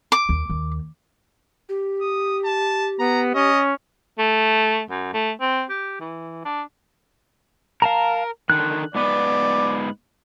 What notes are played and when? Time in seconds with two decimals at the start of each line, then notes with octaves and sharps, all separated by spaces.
0.12 D6
0.29 D#2
0.49 D#2
1.69 G4
2.02 D#6
2.45 A5
3.00 B3 A#5
3.35 C#4 D#5
4.19 A3
4.90 F#2
5.14 A3
5.41 C4
5.69 G4
6.00 E3
6.45 D4
7.82 A#4 F5 A5 A#5
8.50 D3 D#3 F#6
8.95 G#2 B3 B4 D5